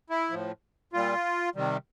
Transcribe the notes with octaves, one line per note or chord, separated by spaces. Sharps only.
E4
A2 F3
A#2 G3 F4
C3 D#3 G3